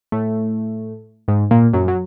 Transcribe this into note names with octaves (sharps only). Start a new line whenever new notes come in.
A2 A3
G#2 G#3
A#2 A#3
F#2 F#3
F#3